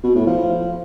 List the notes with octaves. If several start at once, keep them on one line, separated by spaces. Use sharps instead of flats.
B2
A2
F3